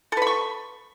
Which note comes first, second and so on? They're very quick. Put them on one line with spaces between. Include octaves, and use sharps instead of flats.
A4 B4 B5 C#6